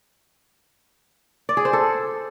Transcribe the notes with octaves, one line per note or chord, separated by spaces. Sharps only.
D5
G#4
C5
A4